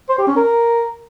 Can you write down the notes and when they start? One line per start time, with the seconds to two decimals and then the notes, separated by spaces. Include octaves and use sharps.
0.09 C5
0.18 G4
0.27 C#4
0.36 A#4